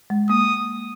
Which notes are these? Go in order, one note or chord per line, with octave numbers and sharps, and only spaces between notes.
G#3
A#3 D#6